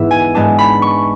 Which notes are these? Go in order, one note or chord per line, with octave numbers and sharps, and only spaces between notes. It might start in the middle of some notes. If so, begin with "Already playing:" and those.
Already playing: G#2 E3 B3 E5
G#5
G#2 G#3 B3 D4 A5
B5
C#6